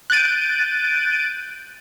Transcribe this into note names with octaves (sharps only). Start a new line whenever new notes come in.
F#6 G6 A6 D7 D#7